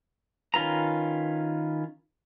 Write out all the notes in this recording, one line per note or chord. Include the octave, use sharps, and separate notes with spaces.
D#3 C#4 F4 B4 A#5